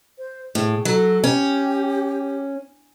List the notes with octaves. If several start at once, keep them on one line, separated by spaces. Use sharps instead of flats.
C5
A2 G#4
F#3 A4
C#4 G4